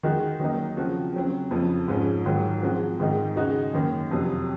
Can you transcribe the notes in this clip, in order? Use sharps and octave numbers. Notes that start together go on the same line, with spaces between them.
D#3 G#3 D#4 F#4
D#3 F#3 A#3 D#4
C#3 F3 C4 F#4
C#3 F#3 C4
F2 C#3 F3
G#2 F3 G#3 C#4
G#2 D#3 F#3
F3 G#3 C4 F#4
G#2 D#3 G#3 D#4
C#3 G#3 D#4 F#4
F#2 D#3 A#3 C#4
F2 C3 F#3